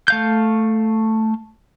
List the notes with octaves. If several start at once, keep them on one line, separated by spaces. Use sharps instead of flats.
A3 F5 G6